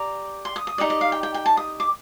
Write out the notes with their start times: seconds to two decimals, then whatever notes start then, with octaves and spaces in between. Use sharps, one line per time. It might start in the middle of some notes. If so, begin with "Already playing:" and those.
Already playing: G4 D5 A#5
0.45 C6
0.56 D#6
0.67 D#6
0.78 D#4 G4 D5
0.90 D#5
1.01 F5
1.12 G5
1.23 G5
1.34 G5
1.46 A5
1.57 D#6
1.80 D6